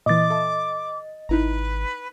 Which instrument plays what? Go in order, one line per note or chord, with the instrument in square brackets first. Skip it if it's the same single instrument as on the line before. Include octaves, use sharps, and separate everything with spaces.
[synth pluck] A#2 E3 [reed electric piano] D#5 A6 [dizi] D6
[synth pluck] A4 E5 A5
[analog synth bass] G#1 [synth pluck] D#4 E4 A#5 [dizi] B4